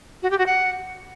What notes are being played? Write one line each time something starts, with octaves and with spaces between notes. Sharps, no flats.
F#4
G4
F#4
F#5